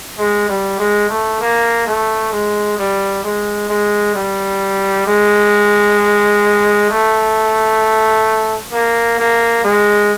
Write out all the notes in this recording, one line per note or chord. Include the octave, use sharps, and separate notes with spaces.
G#3
G3
G#3
A3
A#3
A3
G#3
G3
G#3
G#3
G3
G#3
A3
A#3
A#3
G#3